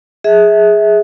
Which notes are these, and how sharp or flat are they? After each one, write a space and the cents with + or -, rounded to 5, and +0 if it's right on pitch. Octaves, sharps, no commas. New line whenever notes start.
G#4 +0 E5 -25